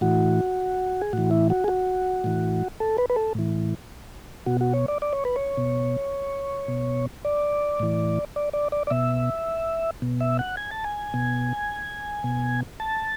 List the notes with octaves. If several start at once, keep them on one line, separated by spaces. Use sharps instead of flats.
A2 E3 F#4
G#4
A2 E3 F#4
E4
F#4
G#4
F#4
A2 E3
A4
B4
B4
A4
A2 E3
B2 F#4
F#4
C#5
D5
D5
C#5
B4
C#5
B2
B2
D5
A2 E3
D5
D5
D5
D5
B2 E5
B2
E5
F#5
G#5
A5
G#5
B2
B2
A5